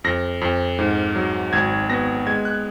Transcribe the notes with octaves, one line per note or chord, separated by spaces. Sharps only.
F2 A#6
F2
G#2
F#3
G#1 G#6
B3 A#6
G#3 G#6
F#6